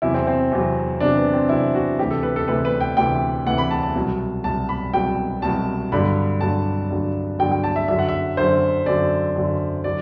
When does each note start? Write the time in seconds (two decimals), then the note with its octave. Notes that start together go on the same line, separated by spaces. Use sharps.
0.02 E2 C3 F#3 E4
0.14 C4
0.27 C4
0.51 E2 C3 F#3
1.00 E2 C3 F#3 D4
1.17 B3
1.33 C4
1.49 E2 C3 F#3 E4
1.75 F#4
1.99 D2 C3 E3 G4
2.11 A4
2.23 B4
2.36 A4
2.48 D2 C3 E3 B4
2.65 B4
2.81 G5
2.97 D2 C3 E3 G5
3.46 D2 C3 E3 F#5
3.58 B5
3.71 A5
3.83 A5
3.95 C2 B2 F#3
4.44 C2 B2 F#3 A5
4.69 B5
4.93 C2 B2 F#3 G5
5.42 C2 B2 F#3 A5
5.92 G2 D3 F#3 B5
6.41 G2 D3 F#3 A5
6.91 G2 D3 F#3
7.39 G2 D3 F#3 G5
7.51 G5
7.64 A5
7.76 E5
7.88 F#2 D3 F#3 E5
7.99 F#5
8.09 E5
8.37 F#2 D3 F#3 C5
8.86 F#2 D3 F#3 D5
9.36 F#2 D3 F#3
9.84 D3 F#3 D5